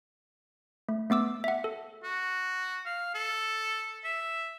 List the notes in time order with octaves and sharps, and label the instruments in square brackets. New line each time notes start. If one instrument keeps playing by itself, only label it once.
[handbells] A3
A3 B3 D6 E6
E5 F#5
A4
[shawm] F#4
F5
A4
E5